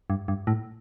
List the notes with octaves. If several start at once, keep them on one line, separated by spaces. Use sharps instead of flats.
G2
G2
A2